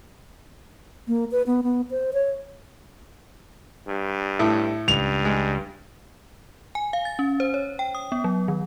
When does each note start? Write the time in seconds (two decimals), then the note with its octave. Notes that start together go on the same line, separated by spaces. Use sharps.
1.08 A#3
1.32 B4
1.47 B3
1.63 B3
1.91 C5
2.13 C#5
3.87 G2
4.39 A2 A4 E5
4.88 C#2 G2 F7
5.25 G#3
6.75 G#5
6.93 F5
7.05 A6
7.19 C#4
7.40 C5
7.54 C#5
7.79 G5
7.95 D#6
8.12 B3
8.24 F#3
8.48 D#3